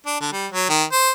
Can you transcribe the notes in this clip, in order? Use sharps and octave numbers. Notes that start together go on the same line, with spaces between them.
D4
D3
G3
F#3
D#3
C5